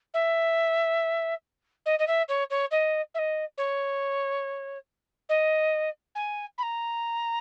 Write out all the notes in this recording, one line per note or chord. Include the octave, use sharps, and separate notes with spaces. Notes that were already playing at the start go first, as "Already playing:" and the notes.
E5
D#5
D#5
E5
C#5
C#5
D#5
E5
D#5
C#5
D#5
G#5
B5
A#5